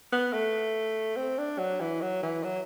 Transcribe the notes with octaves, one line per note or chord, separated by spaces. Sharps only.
B3
A3
C4
D4
F#3
E3
F#3
E3
F#3